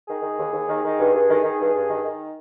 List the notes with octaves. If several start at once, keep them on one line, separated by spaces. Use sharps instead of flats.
D#3 G#4
D#3
D#2
D#2
D#3
D#3
G2
G2
D#3
D#3
G2
G2
D#3
D#3